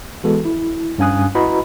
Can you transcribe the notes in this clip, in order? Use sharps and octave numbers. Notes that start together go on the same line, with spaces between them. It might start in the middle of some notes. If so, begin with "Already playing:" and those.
E3 G#3 B3 F#4 A4
E4
G2 C#4 F5 G#5 D#6 F#6
E4 F#4 B4 D#5 A#5 B5